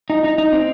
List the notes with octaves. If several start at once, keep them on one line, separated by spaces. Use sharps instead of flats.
D#4
D#4
D#4
C4